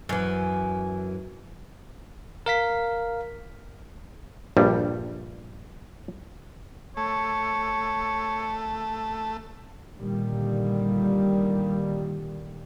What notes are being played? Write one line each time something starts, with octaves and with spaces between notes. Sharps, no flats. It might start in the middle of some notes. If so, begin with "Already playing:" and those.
F#2 E3
A#4 F5 B6
A#1 G2 G3
A3 C#5
A#2 D3 D#3 G3